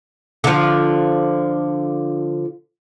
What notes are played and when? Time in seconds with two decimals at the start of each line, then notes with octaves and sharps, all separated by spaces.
0.44 D3 F3